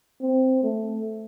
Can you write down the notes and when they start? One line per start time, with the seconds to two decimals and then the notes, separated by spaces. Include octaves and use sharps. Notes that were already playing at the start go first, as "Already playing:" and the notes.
0.21 C4
0.63 A3